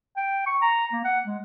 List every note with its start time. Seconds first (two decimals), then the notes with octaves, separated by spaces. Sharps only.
0.17 G5
0.46 C#6
0.62 A#5
0.93 A#3
1.04 F#5
1.26 G#3